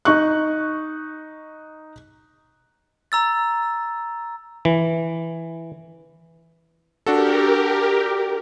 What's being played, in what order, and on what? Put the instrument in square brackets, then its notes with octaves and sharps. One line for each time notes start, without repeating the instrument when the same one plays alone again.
[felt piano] D#4 C#6 F#6
[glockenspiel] A#5 E6 A6
[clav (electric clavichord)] E3
[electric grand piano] D4 F#4 A4 [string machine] G4 A#4